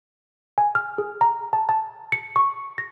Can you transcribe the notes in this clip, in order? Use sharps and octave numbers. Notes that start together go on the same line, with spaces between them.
G#5
F6
G#4
A#5
A5
A5
C#7
C#6
A#6